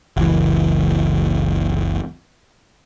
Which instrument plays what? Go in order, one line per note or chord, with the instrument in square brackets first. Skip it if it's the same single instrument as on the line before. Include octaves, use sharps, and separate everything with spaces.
[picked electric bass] F#1 C#2 E3